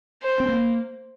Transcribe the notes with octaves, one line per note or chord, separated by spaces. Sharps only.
C5
C4
A#3